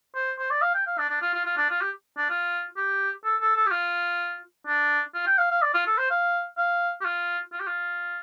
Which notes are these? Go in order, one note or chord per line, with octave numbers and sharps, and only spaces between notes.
C5
C5
D5
F5
G5
F5
D4
D4
F4
F4
F4
D4
F4
G4
D4
F4
G4
A4
A4
A4
G4
F4
D4
F4
G5
F5
F5
D5
F4
A4
C5
F5
F5
G4
F4
F4
G4
F4